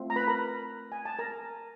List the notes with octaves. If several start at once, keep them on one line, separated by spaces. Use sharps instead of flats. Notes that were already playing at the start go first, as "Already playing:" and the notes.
Already playing: A3 C4 F4
A#5
B4 B5
A#4 A#5
G#5
A5
A#4 A#5